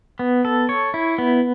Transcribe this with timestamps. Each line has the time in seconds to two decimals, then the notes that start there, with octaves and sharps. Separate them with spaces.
0.19 B3
0.45 A4
0.69 C#5
0.94 E4
1.18 B3